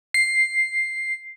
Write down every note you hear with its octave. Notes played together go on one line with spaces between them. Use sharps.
C7